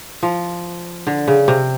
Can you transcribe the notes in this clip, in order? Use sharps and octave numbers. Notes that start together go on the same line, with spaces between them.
F3
D3
C#3
C3